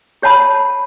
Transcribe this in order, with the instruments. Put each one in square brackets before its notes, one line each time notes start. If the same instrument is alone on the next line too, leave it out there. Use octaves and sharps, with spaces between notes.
[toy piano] G4 C#5 F#5 A5 B5